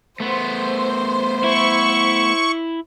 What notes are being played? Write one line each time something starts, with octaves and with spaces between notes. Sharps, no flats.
A3 B3 C5
E4 C#6